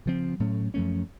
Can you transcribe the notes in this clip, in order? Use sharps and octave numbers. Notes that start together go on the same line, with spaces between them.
C#3 F3 C4
A2 F#3 A3 C#4
F#2 F3 A3 C#4